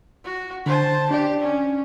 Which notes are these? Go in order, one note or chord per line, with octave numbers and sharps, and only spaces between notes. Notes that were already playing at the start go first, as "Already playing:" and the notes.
F#4
D3 C5 A5
D4 G4 D5
C#4